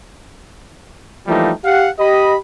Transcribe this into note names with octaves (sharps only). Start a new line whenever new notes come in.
E3 F3 G3 A3 A#3 D#4
G4 F5 F#5
G4 D#5 B5